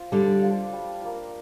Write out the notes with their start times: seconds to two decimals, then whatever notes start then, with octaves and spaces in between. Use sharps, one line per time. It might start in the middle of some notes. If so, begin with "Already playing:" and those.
Already playing: F4 C5 F5
0.12 D3 G3 D4
0.42 F4 C5 F5
0.73 G3
1.02 A#3 F4